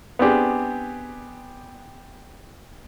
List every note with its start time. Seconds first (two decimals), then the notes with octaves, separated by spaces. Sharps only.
0.19 B3 C4 D4 G4 G#4